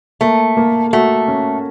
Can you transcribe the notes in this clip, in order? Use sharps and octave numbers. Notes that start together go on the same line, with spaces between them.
A3 A#3
A#3
A3 F#4
C#4